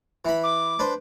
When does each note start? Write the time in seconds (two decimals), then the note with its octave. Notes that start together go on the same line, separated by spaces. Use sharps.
0.25 E3 B5
0.43 D6
0.79 D4 B4 C5